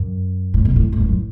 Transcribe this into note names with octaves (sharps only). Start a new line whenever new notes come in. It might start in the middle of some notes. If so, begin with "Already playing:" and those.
Already playing: F#2
A2
B2
A2
A2
F#2
A2